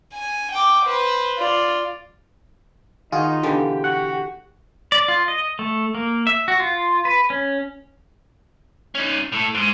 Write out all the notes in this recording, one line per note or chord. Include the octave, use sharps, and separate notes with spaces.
G#5
G5 D6
B4 C5
F4 D5
D#3 D#4 F4 F#4 G#4
B2 D3 E3 G4
F#4 F#5
D5
F4
D#5
A3
A#3
E5
F#4
F4
B4
C#4
C#4 D#4
A2 A4
G#2 G#3